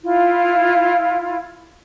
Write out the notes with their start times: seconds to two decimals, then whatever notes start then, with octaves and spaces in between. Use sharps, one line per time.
0.01 E4 F4